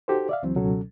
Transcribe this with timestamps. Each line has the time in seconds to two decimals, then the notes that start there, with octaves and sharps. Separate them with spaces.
0.08 D#4 F#4 G4 A4 C5
0.29 D5 E5 F5
0.42 C#2 E3 F#3 C4
0.56 C#2 B2 F#3 C#4 A4